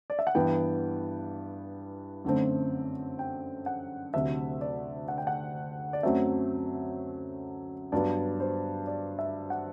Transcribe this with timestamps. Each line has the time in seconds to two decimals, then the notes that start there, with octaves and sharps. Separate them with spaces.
0.10 D5
0.19 E5
0.27 F#5
0.35 G2 E3 B3 G5
2.24 F#2 D3 A3 C4
3.19 G5
3.66 F#5
4.14 D2 C3 F#3 E5
4.61 D5
5.08 F#5
5.18 G5
5.27 F#5
5.93 D5
6.03 F#2 F#3 A3 C4 E5
7.92 G2 F#3 B3 D5
8.40 C5
8.87 D5
9.19 E5
9.50 F#5